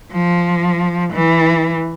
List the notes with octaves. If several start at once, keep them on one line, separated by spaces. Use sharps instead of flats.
F3
E3